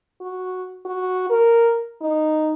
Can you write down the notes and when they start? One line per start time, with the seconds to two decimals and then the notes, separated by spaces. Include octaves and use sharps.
0.21 F#4
0.85 F#4
1.30 A#4
2.01 D#4